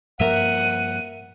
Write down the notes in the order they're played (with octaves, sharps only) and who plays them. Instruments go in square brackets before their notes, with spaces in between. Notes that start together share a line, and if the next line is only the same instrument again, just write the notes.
[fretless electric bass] G2 F3 A#3 [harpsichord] A#4 E5 [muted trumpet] F#5 [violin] D#7